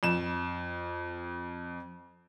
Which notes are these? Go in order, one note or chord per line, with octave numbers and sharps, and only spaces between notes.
F2 E7